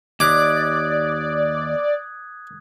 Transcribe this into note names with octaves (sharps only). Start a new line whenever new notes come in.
D#2 D5 D6 D#6 F#6 G#6